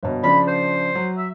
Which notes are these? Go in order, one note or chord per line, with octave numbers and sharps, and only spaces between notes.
G1 B2
C#3 F3 D4 B5
C5
F#3
E5